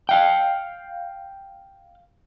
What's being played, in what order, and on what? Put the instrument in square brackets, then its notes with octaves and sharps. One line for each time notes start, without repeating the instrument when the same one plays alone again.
[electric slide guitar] F5 G5